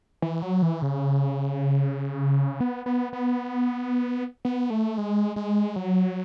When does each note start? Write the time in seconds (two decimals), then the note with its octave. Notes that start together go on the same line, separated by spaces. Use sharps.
0.22 E3
0.42 F#3
0.62 E3
0.82 C#3
2.60 B3
2.86 B3
3.13 B3
4.45 B3
4.70 A3
4.98 G#3
5.36 G#3
5.76 F#3